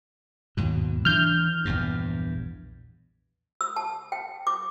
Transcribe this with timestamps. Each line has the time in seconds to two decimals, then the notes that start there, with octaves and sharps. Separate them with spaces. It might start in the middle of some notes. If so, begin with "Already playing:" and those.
0.57 D#2 G#2 B2
1.05 E3 D4 F6 G6
1.65 A#1 E2 G2
3.61 E6
3.76 A5
4.12 G5
4.47 D6